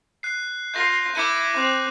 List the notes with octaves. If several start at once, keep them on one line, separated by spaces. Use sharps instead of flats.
F#6 C7
F4 G6 A#6
E4 D6 C#7 D#7
C4 F#6